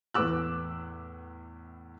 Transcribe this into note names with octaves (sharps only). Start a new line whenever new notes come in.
E2 A2 B4 D6 E6 F#6